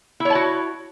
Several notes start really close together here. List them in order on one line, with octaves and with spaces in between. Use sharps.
E4 C#5 A5 F#4